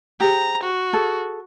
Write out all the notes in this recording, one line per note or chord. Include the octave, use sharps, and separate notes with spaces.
G4 G#4 C5 A#5
F#4
G#4 A4